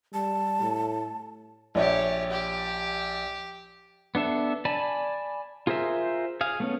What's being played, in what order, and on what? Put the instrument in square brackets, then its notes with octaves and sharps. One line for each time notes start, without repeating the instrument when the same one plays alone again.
[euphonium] G3 [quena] A5
[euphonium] A2
[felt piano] A#1 D5 E5 [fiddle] G4 C#5
[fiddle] G4
[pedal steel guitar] B3 D4 A4 E5
D5 G#5 A5 B5
F4 G#4 A#4 C5 E5
G#4 F5
A3 B3 C#4